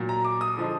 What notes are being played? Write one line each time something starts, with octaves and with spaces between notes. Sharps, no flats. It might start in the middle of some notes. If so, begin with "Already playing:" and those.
Already playing: A#2 F#3
A#5
D6
D#6
D3 F3 G#3